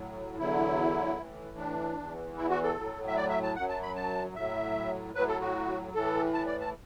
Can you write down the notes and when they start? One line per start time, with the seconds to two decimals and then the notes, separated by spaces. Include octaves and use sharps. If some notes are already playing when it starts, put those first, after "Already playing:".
Already playing: A2 F#3
0.38 E2 D3 F#3 E4
1.18 A2 E3
1.58 D4
1.97 E2 E3
2.37 E4
2.50 F#4
2.63 A4
2.77 A2 F#3
3.08 E5
3.17 D5
3.30 E5
3.43 A5
3.56 F#2 F#3 F#5
3.69 A5
3.83 B5
3.95 A5
4.35 A2 F#3 E5
5.14 A2 F#3 B4
5.28 A4
5.41 F#4
5.94 A2 E3 A4
6.34 A5
6.47 D5
6.61 A5